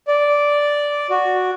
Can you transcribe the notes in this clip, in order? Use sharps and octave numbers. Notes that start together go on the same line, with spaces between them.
D5
F#4